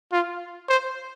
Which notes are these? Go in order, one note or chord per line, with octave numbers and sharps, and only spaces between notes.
F4
C5